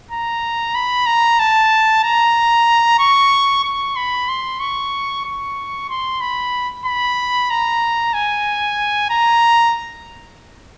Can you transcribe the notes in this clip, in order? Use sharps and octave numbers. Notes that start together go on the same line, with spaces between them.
A#5
B5
A#5
A5
A#5
C#6
C#6
B5
C6
C#6
C#6
C6
B5
B5
A#5
G#5
A#5